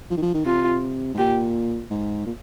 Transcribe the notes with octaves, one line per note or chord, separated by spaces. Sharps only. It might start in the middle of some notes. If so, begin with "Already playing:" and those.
F3
D#3
F3
D#3
C3 F4
G#2
A#2 G4
G#2
A#2